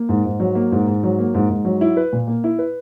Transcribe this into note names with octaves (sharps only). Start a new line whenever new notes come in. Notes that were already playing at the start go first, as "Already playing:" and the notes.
Already playing: A#3
G#2
G#2
F#3
A#3
G#2
G#2
F#3
A#3
G#2
G#2
F#3
E4
B4
A#2
A#3
E4
B4